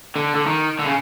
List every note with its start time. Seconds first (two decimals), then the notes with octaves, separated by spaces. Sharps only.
0.16 D3
0.35 D3
0.47 D#3
0.79 D3
0.85 C#3